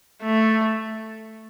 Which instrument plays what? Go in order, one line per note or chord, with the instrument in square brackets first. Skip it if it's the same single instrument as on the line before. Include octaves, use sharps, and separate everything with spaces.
[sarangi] A3